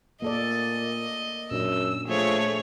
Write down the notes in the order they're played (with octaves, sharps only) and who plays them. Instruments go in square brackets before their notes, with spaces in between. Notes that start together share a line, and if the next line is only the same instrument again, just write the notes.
[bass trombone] A#2 [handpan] A#3 A4 D5 [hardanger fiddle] D#5
[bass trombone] F#2 [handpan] A#2 D4 [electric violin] E6
[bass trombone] F3 [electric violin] A3 C#5 [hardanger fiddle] G#4